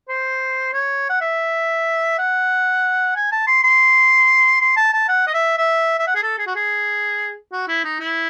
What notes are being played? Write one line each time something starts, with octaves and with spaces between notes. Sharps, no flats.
C5
C#5
F#5
E5
F#5
G#5
A5
C6
C6
C6
A5
A5
F#5
D#5
E5
E5
E5
F#5
G#4
A4
G#4
F#4
G#4
F#4
E4
D#4
E4